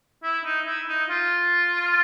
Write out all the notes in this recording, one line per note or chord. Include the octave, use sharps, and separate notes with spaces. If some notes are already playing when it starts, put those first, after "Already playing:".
E4
D#4
E4
D#4
F4